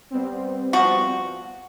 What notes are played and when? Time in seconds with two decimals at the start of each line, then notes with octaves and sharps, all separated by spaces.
0.11 G3 B3 C4
0.73 F3 F#4